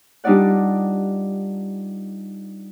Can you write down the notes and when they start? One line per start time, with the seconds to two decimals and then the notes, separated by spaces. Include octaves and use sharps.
0.24 G3 D4 D#4 F4 D5 F#5